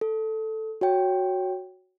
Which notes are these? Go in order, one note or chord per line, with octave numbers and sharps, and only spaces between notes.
A4
F#4 C#5 G5